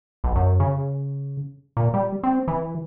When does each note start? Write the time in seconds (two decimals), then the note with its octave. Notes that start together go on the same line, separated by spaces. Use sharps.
0.24 B1
0.36 F#2
0.60 C#3
1.77 A#2
1.94 G3
2.23 C4
2.48 E3